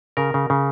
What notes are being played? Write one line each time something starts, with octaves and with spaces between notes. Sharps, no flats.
C#3 A#4
C#3
C#3